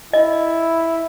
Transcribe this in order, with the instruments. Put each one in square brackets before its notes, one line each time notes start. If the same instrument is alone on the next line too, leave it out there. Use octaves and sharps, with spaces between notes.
[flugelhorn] E4 [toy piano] D#5